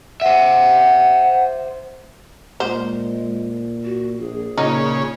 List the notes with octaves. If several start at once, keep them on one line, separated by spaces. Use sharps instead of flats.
C5 E5 F#5
A#2 G#3 C5
F#4
A#1 G#4
A#2 C#3 D#4